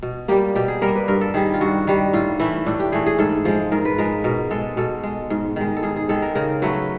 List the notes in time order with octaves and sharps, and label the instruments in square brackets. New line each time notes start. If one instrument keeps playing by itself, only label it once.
[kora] B2
G3 A#3 G4
B2 G4
G#4
G3 A#3 A#4
B4
G2 A#4
A4
D#3 G3 G#4
F4
G2 F#4
D#3 G3
A2 F4
E3 A3 E4
A2 D4
G4
E3 A3 G#4
G#4
G#2 A4
F3 G#3
G#2 A#4
B4
F3 G#3 A#4
B2 A#4
G#3 A4
B2 A4
G#3
G#2
D#3 G#3
A4
G#2 G#4
G#4
D#3 G#3 A4
A#4
C#3 A#4
F#3 A3 B4